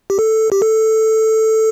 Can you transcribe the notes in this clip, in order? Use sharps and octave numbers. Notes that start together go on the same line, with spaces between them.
G4
A4
G4
A4